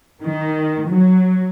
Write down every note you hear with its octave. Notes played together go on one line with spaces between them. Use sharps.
D#3
F#3